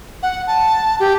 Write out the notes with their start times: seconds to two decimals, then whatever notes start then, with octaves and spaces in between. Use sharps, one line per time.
0.23 F#5
0.47 A5
1.00 G4